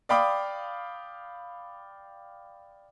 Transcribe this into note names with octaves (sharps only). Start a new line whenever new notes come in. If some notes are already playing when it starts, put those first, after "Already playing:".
D5 F5 G5 B5 D6 D#6